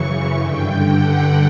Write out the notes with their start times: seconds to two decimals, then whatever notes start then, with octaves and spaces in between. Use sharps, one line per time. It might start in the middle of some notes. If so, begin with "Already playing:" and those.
Already playing: F#2 C#3 E3 C#6
0.38 G2 D3 G5
0.85 F#5